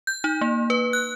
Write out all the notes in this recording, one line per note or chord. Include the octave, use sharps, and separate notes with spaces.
G6
D#4
A#3
B4
F#6